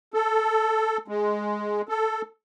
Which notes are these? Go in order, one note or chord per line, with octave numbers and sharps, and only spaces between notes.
A4
G#3
A4